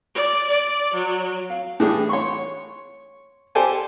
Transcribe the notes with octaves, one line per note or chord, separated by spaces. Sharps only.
D5
D5
F#3
F5
A2 E3 D4 G4 G#4
C#5 C6 C#6
G4 A4 C5 D5 G#5 A5